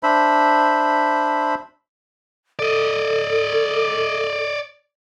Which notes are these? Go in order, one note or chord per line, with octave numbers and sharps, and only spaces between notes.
D4 C5 E5 B5
A4 D5 D#5